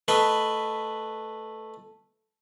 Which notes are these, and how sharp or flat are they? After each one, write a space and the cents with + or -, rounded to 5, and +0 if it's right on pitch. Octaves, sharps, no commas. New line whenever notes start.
A3 +0 B4 +0 D#5 +0